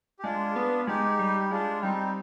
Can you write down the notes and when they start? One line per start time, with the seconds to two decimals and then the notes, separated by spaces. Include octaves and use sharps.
0.19 G4
0.24 G#3 D4 F4
0.56 B3
0.87 G#3 D#4 G4
1.19 G3
1.39 G4
1.51 G#3 D4 F4
1.83 G3 C4 D#4